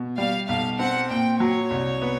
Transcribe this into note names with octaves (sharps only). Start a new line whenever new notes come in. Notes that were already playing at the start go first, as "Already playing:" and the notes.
Already playing: B2
G3 F5
B1 F5
C4 F#5
A#2 G5
F#3 C#5
C2
B3